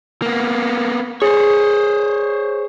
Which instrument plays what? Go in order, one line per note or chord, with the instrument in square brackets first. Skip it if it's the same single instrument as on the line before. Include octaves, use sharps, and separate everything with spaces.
[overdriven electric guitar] A#3 B3
[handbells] G#4 [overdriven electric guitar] C5 C#5